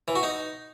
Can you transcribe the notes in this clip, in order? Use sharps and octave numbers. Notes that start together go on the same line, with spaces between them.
E3
F#4
D#4